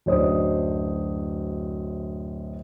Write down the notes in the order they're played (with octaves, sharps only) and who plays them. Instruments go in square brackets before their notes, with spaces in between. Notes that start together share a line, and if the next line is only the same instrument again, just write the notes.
[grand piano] D1 F#2 D4 C5 D#5 D#6